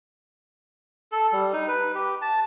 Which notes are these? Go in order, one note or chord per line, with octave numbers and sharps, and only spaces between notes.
A4
G3
D#4
B4
G4
A5